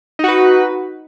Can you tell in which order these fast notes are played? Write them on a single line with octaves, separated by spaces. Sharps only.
D#4 F#4 B4